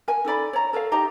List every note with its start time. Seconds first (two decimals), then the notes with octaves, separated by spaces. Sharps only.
0.08 A#4 G#5
0.25 D#4 A4 D5 B5
0.53 C#5 A#5
0.73 A4 A#4 C#5 F5
0.91 D#4 G4 D#5 A#5